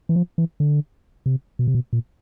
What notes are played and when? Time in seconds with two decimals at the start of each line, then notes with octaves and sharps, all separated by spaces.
0.09 E3
0.16 F3
0.38 E3
0.60 D3
1.26 C3
1.59 B2
1.68 C3
1.75 B2
1.93 A#2